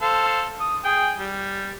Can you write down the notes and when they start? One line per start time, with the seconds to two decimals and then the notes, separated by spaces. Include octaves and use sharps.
0.02 A4 C5 F5
0.60 D#6
0.84 G#4 G5
1.18 G3